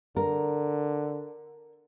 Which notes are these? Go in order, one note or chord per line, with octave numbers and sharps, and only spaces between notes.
D3 A#4